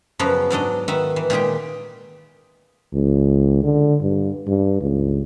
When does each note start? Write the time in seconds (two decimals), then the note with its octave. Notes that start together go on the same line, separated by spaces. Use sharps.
0.19 F#2 C#3 F3 B3 A#5
0.50 G#2 F#3 D4 D#5
0.88 D#3 B4 E5 F#5
1.16 E3
1.30 A#2 D#3 G#3 G4
2.93 C#2
3.63 D3
4.01 G2
4.47 G2
4.81 C#2